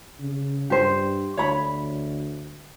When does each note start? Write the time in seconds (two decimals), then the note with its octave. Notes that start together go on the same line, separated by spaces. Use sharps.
0.20 C#3
0.70 G2 G4 C5
1.37 D2 C#5 B5